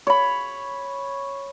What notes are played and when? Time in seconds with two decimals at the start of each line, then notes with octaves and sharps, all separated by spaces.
0.07 C#5 B5